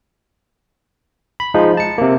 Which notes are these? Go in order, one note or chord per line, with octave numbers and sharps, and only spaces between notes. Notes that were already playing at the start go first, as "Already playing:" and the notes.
B5
F3 G#3 D#4
A5 C#7
C3 A#3